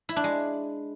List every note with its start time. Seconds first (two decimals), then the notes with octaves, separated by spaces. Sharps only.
0.09 E4
0.16 D4
0.24 G#3